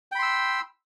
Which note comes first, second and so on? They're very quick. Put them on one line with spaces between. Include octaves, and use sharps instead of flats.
G5 B5 C6 E6